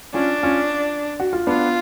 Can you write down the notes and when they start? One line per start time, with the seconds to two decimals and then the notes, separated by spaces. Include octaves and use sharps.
0.14 C#4 D4 F4
0.43 C#4 F4
1.20 F#4
1.33 F4
1.47 B3 D4 F4